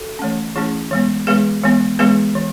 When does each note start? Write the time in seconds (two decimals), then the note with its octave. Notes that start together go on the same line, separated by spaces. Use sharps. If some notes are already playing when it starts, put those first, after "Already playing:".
Already playing: F#4 A4
0.19 E3 A3 C#4
0.56 E3 A3 C#4 E4 G#4
0.91 E3 G#3 B3
1.27 E3 G#3 B3 G#4 B4
1.64 E3 G#3 B3
1.99 E3 G#3 B3 G#4 B4
2.35 E3